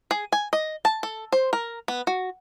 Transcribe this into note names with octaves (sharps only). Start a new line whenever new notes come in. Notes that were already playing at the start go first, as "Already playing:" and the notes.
G#4
G#5
D#5
A5
A4
C5
A#4
B3
F#4